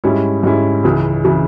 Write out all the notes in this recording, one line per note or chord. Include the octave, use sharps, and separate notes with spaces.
G#2 G3 C#4 E4
G#2 G3 C#4 E4
C#2 C#3 E3
C#3 E3